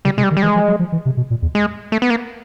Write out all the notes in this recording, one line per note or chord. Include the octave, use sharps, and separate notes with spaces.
C#3 G3
C3 G#3
G3
D#3
G3
E3 G#3
F3
F#3
F3
E3
C3
B2
A#2
E2
G#3
A3
B3
A#3